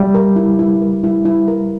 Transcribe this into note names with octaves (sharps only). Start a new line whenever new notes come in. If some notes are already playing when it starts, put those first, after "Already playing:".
Already playing: G3 E5
A#4
E4
E4
A#4
E4
E4
A#4